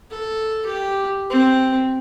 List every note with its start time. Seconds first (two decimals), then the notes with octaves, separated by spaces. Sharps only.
0.11 A4
0.65 G4
1.30 C4